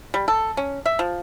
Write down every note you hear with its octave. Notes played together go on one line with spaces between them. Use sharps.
G3
A4
C#4
E5
F3